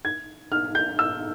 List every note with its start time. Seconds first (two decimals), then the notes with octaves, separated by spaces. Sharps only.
0.05 G#6
0.52 F6
0.75 G6
0.99 E6